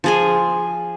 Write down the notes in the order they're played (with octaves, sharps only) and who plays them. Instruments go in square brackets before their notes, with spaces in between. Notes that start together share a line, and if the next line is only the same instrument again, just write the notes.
[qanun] F3 G#4 G#5